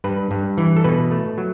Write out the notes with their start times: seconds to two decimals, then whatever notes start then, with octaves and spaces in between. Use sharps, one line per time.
0.04 G2 B4
0.31 G2
0.58 E3
0.76 A4
0.84 B2 B4
1.11 A3
1.38 F#3